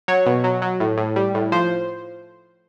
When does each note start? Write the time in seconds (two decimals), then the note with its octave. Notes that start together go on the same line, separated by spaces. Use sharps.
0.08 F#3 C#5
0.26 B2
0.44 F#3
0.62 F#3
0.80 A2
0.98 A2
1.16 G3
1.34 A2
1.52 F3 C5